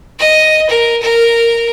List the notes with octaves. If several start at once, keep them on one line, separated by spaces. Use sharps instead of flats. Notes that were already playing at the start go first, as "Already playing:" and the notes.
D#5
A#4
A#4